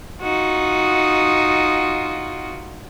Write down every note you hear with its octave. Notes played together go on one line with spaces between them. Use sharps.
D#4 F4 F#4